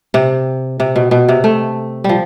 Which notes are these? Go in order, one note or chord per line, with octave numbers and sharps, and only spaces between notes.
C3
C3
B2
B2
C3
A3
F3 G3